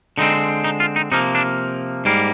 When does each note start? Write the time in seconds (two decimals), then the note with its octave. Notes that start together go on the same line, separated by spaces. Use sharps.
0.18 D3 G#3 C4 D#4
0.64 D#4
0.80 F4
0.96 D#4
1.12 C3 F3 A#3 D#4
1.35 D4
2.05 G#2 G3 A#3